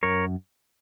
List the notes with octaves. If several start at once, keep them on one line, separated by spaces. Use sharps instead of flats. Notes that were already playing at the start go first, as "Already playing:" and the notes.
F#2 A#4 C#5